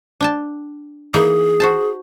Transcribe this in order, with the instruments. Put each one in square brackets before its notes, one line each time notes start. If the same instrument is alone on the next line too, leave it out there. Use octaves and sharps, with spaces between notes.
[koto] D4 G5 A5
[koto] E3 A#3 D#4 [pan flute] G#4
[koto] F#4 C5 A5